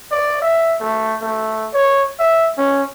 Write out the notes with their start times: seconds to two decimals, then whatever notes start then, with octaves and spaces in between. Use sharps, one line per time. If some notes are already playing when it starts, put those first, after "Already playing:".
0.11 D5
0.42 E5
0.80 A3
1.22 A3
1.73 C#5
2.19 E5
2.58 C#4